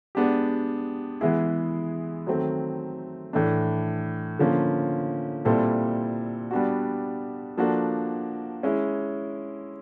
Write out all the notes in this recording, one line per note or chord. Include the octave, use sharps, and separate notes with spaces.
G#3 B3 D4 G4
E3 G#3 B3 E4 G#4
D#3 F#3 A3 C4
A2 E3 A3 D4
D3 F3 A#3 C#4
A#2 G3 C4 E4 A4
G3 B3 D4 F#4
F3 A#3 D4 F#4 A4
G#3 C#4 E4